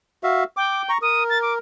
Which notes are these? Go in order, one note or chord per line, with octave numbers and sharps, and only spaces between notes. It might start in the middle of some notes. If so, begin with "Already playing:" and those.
F#4 E5 F5
G5 D6
A#5 C#6
A#4 D#6
A6
D6